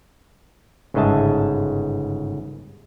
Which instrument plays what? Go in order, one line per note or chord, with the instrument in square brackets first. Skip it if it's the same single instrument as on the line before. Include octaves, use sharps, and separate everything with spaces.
[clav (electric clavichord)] G1 G#2 C#3 D#5 E5 A5